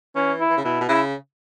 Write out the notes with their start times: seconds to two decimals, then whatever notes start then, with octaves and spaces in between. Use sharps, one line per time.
0.16 E3 C#4
0.40 E4
0.50 E3
0.57 C#3
0.64 B2 E4
0.81 B2
0.88 C#3 E4